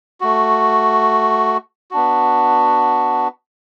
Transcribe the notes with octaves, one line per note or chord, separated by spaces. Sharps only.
A3 F#4
B3 D4 F#4